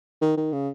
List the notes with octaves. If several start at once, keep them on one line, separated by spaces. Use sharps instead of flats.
D#3
D#3
C#3